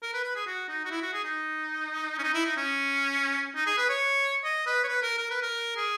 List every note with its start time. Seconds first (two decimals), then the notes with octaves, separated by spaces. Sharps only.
0.03 A#4
0.14 B4
0.24 B4
0.35 G#4
0.47 F#4
0.69 D#4
0.85 F#4
0.91 E4
1.02 F#4
1.13 G#4
1.24 D#4
2.19 C#4
2.23 D#4
2.34 E4
2.46 D#4
2.57 C#4
3.56 D#4
3.67 G#4
3.78 B4
3.89 C#5
4.44 D#5
4.67 B4
4.84 C#5
4.88 B4
5.03 A#4
5.18 A#4
5.30 B4
5.43 A#4
5.77 G#4